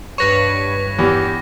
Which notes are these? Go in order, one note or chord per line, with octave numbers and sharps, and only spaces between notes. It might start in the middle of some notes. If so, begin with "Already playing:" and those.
G2 B4 C#5 C#6 A#6
E2 G4